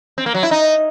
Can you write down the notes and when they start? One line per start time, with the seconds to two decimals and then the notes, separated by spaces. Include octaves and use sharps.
0.18 C4
0.26 A#3
0.34 F#3
0.43 E4
0.51 D#4